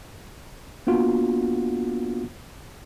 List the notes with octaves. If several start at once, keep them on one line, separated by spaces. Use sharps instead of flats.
A#3 B3 D4 F4 F#4